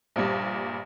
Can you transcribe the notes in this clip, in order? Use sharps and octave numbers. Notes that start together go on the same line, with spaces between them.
A#1 G2 A#2 G3